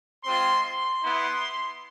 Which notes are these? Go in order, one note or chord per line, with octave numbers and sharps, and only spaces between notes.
G#3 C4 F4 C6
C6
B3 E4